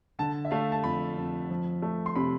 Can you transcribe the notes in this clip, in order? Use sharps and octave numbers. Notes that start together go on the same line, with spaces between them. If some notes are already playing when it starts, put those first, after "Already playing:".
D3 A5
E5
A3 F5
A5
F2 B5
F2
F3
A3
C6
C3 B5